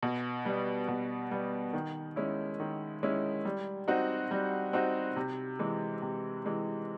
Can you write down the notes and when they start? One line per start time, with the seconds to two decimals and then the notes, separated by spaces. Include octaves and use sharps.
0.03 B2
0.45 G3 B3
0.88 B2
1.31 G3 B3
1.73 D#3
2.16 G#3 C#4 E4
2.60 D#3
3.03 G#3 C#4 E4
3.45 G3
3.88 C4 D#4 F#4
4.31 G3
4.73 C4 D#4 F#4
5.16 C3
5.59 E3 G#3
6.02 C3
6.46 E3 G#3